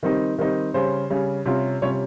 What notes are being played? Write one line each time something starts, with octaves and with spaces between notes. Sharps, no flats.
D#3 G3 C4 D#4
D#3 G3 C4 D#4
C#3 G3 C#4 C5
C#3 G3 C#4
C3 G3 C#4 F4
C3 G3 C#4 F4 C#5